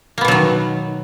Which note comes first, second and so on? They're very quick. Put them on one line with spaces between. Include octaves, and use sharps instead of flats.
A#3 B3 B2 F#3 D#3